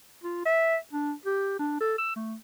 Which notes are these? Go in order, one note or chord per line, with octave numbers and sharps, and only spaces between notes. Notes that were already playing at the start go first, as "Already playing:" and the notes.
F4
E5
D4
G4
D4
A4
E6
A3